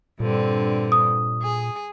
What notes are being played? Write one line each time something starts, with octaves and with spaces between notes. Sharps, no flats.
G2 A#2 D3 C4
D#6
G#4